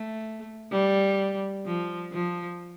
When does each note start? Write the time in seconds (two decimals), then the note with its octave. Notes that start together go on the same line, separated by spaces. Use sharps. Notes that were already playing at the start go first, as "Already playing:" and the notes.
Already playing: A3
0.71 G3
1.66 F3
2.12 F3